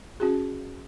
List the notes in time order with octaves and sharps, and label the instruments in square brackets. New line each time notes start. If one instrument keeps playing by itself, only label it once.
[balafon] C#4 F#4 G#4